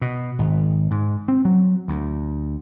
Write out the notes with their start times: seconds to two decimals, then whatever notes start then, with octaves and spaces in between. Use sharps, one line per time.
0.01 B2
0.39 G#1
0.91 G#2
1.28 C4
1.45 F#3
1.88 D2